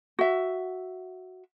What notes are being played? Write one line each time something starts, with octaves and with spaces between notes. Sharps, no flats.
F#4 E5